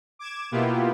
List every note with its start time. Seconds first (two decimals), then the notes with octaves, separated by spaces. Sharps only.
0.19 D6 G#6 E7
0.51 B2 A#3 B3 E4 F4 G4